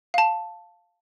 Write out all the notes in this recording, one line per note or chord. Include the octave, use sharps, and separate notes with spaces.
F5 A5